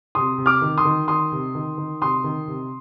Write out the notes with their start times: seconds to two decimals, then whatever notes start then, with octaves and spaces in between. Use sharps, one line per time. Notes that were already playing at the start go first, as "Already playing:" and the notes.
0.15 C3 C6 D#6
0.38 C3
0.46 D6 F6
0.62 D#3
0.78 C6 D#6
0.85 D#3
1.08 D#3 C6 D#6
1.32 C3
1.55 D#3
1.78 D#3
2.02 C3 C6 D#6
2.24 D#3
2.47 C3